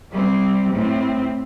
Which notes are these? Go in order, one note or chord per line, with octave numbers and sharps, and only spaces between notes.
G3 C4
A2 C4